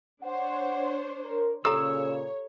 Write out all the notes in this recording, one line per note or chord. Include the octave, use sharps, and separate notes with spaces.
D4 C5 C#5 F#5
A#4
A#2 C#3 G4 A4 C#5 A#5 E6